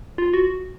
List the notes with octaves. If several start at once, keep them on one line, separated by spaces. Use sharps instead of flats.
F4
F#4